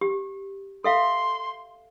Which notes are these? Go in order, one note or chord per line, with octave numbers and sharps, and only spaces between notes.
G4
A4 E5 F5 C6